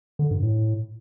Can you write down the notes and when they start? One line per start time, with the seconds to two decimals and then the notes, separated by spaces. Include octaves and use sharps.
0.19 D3
0.31 G2
0.43 A2